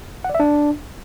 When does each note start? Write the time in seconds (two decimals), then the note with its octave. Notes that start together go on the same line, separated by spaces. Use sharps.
0.24 F#5
0.30 D5
0.35 E5
0.40 D4